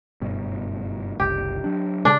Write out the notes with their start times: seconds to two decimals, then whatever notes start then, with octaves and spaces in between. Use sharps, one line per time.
0.21 F#1 G2 B2
1.20 F#1 C2 G4
1.64 F#3 D4
2.05 C#3 D4